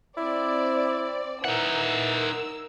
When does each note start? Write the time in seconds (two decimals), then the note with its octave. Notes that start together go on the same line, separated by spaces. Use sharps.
0.17 C4 E4 D5
1.44 E3 D#4 A#4 F#5 E6